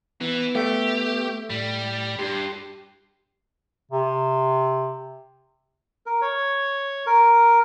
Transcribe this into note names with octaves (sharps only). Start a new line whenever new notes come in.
E3 B3
A3 G4
A2 G3
G2 G4 C6
C3
A#4
C#5
A#4